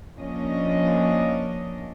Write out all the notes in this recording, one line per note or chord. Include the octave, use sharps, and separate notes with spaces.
F3 A#3 C#4 D4 D#5